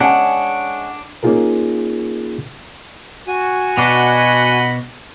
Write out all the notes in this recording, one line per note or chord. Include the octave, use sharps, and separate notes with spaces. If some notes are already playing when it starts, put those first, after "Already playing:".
G#3 C#4 D4 F#5
A#3 C#4 D#4 F4 G#4 A#4
F#4 G#5
B2 D4 D#5 F#5 B5